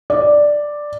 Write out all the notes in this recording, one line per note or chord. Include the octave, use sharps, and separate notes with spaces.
D5